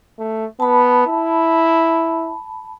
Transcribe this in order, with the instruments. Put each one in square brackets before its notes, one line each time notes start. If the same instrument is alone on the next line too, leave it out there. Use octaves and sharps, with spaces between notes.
[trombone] A3
[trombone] B3 [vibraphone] A5 B5
[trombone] E4